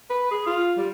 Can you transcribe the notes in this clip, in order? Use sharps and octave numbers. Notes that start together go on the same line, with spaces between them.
B4
G#4
F4
G3